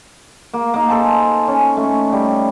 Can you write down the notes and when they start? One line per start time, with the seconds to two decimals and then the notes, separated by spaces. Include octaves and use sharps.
0.54 A#3
0.74 A#3 D#4
0.88 A4 C5 G#5 A5
1.48 C#4
1.77 A3 C#4
2.12 G3